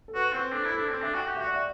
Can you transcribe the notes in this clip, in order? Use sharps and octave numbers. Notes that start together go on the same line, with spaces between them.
A4
F#4 B4
C4 C5
D4 A4
E4
A4
D4
C4 A4
D4 E5
F#4 G5
G4 F#5
E5
F#4
D5
F#4 E5